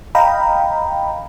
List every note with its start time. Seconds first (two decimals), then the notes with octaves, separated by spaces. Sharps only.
0.15 D#5 F5 G5 A#5 B5